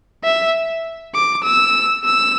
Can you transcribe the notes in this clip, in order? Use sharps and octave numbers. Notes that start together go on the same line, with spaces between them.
E5
D6
E6
E6